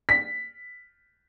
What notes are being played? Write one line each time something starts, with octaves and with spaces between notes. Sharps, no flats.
B6